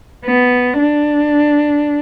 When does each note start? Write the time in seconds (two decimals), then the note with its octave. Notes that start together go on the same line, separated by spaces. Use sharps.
0.24 B3
0.79 D4